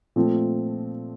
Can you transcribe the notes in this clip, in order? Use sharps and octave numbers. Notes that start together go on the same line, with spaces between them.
A#2 F3 A3 C4